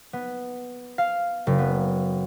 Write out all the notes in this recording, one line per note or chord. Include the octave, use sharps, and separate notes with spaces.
B3
F5
F#1
B3